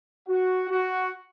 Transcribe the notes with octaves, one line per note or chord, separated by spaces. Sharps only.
F#4
F#4